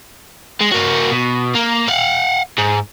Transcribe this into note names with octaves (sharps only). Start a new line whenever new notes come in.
G#3
A#3 F#4
B2
A#3
F5 F#5
G#2